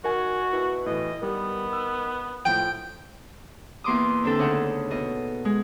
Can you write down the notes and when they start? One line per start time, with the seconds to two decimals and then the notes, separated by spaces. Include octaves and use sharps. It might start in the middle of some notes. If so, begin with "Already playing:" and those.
0.04 D#3 F#4 A#4 G#5
0.53 B2 E4
0.86 A2 E3 D#5
1.23 D#3 G3 B3
1.73 E6
2.45 A2 F3 G5
3.84 E2 A#3 C6 D6 D#6
4.24 D3 C4 D4 A4 G5
4.39 D2 C#3 C#4 D#4 F#5
4.90 B2 D#5
5.45 G#3